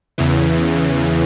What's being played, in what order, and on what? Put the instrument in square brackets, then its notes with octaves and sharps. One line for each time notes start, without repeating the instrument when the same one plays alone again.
[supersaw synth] E2 C#3 E3